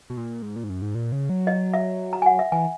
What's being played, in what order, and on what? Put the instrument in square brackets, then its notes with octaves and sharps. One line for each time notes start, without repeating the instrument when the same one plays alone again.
[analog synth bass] B2
A#2
G#2
A#2
G#2
F#2
G#2
A#2
C#3
F#3
[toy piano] D#5
E5
A#5
G#5
F#5
E5
[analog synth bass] E3 [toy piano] G#5